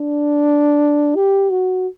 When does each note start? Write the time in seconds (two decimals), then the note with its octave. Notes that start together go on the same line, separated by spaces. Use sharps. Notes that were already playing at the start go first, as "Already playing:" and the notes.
Already playing: D4
1.16 G4
1.51 F#4